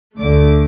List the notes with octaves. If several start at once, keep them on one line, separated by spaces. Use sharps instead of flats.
D2 D3 A3 D6